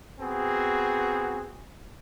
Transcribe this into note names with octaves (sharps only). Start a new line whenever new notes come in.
B3 C4 F#4 G#4